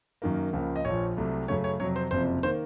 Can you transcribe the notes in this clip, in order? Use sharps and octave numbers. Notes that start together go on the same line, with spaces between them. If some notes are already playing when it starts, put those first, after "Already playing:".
F#2 D#3 A#3
C#2 C#3 F3 A#3
D#5
A#1 A#2 F3 C#5
C2 C3 F#3 A3
F#2 C#3 A3 C#5
C#5
F2 C3 F#3 C#5
C5
F#1 F2 C3 F3 C5
D#3 A#3 C5